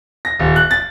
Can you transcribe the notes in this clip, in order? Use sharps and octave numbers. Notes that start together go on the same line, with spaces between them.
A#6
D#1
F#6
A6